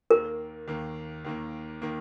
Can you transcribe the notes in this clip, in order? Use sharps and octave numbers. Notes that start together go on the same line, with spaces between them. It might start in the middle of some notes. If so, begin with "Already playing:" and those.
D#2 D#3 A#3 A#4
D#2 D#3 A#3
D#2 D#3 A#3
D#3 A#3